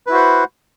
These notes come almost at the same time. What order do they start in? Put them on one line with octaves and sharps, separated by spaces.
B4 E4 F#4 C5 F#5